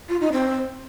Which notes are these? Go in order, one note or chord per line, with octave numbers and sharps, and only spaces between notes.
F4
D#4
C4